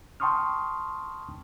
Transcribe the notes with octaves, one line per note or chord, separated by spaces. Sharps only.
G5 A5 C6 C#6 D#6 F6